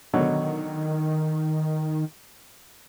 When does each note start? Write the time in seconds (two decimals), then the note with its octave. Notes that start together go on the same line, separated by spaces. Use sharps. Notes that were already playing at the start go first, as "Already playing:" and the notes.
0.13 B2 D3 D#3 F#3